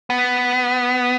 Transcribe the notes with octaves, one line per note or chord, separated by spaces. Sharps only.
B3